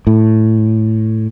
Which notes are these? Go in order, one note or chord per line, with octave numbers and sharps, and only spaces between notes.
A2